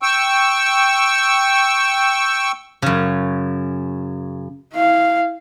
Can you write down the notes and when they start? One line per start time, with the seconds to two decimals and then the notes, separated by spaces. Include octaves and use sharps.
0.02 G5 C#6 E6
2.82 F#2 C#3
4.74 E4 F5